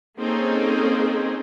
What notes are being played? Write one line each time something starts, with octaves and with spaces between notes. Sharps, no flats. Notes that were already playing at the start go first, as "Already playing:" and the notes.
A#3 C4 C#4 D#4 G#4 A4